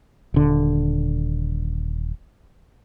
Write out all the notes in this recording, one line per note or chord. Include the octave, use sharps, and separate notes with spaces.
D#1 D3